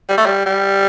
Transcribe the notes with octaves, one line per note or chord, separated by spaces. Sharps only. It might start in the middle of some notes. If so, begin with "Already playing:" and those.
G3
A3
G3
G3